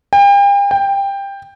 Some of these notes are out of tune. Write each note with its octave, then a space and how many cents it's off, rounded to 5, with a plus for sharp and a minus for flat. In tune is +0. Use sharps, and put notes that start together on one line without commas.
G5 +40
G5 +15